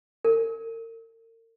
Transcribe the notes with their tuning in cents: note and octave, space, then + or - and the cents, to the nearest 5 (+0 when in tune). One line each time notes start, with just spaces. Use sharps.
A#4 -45